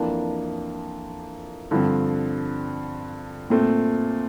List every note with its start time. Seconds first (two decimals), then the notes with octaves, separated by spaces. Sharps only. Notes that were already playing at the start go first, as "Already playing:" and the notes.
Already playing: F2 E3 A#3 D4
1.71 G2 D3 F3 C4
3.50 A#2 A3 C4